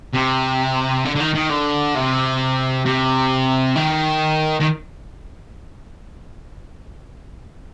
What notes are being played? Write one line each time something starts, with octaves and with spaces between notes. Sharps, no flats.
C3
D3
D3
D#3
D#3
D3
C3
C3
D#3
D#3